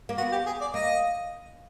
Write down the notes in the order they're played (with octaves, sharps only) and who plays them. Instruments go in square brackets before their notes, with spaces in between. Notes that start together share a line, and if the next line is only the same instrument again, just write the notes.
[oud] A#3
[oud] B3 [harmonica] F#4
[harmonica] G4
G#4
D5
[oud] A#3 [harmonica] D#5